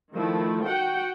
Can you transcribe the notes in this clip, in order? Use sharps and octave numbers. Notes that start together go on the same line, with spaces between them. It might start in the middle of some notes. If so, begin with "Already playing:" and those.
D#3 F3 A3 E4
F#4 F#5 G5